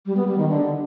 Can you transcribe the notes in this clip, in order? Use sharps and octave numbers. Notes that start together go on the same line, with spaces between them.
G3
B3
G3
D#3
D3